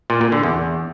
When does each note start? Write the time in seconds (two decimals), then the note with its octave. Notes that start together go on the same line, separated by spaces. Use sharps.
0.10 A#2
0.21 A#2
0.32 D3
0.43 E2